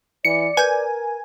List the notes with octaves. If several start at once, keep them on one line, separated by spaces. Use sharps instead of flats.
E3 D5 C#7
A#4 B4 G#5 G6